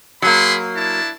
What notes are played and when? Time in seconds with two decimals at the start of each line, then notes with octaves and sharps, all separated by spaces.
0.22 F#3 A#3 G#4 B5 C6
0.76 D4 E4 A5